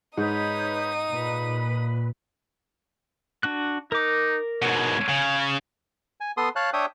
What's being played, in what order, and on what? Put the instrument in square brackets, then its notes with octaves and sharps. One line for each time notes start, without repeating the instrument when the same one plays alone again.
[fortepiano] G#2 [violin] D#4 D#6 [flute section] B4 C#5 G6
[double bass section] A#2 [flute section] B4
[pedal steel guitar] D4 F#4 F#6
[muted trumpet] D#4 [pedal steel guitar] A#4 D6
[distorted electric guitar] G#2 B2 [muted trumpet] C#5
[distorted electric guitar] C#3
[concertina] G#5
B3 A4 C6 D#6
C#5 F5 A5 F#6
D4 C#5 E5 G5 D#6